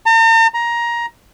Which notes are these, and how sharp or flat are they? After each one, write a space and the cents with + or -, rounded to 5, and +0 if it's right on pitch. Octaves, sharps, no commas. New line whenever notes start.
A#5 -45
A#5 +15